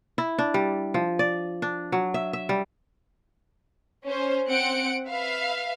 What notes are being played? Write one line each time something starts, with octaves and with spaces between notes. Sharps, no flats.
E4
D4
G3
F3
D5
D4
F#3
E5
E5
G3
C#4 C5
C4 F#5 C#7 D7
B4 E5 F5